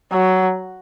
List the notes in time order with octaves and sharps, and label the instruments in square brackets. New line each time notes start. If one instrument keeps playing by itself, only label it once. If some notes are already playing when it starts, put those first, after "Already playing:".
[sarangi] F#3